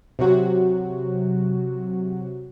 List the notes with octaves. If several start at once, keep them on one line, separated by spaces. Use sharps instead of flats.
C3 F#3 F#4